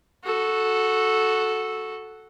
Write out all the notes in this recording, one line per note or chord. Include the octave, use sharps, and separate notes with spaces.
F#4 A4